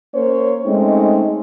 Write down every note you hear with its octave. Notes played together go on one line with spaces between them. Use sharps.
A#3 C#4 C5 C#5
G#3 A3 C4 C#4 D#4